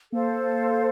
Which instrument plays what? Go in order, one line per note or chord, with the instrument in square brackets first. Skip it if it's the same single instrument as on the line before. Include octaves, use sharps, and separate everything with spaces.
[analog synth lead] A#3 [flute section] A4 C5 F5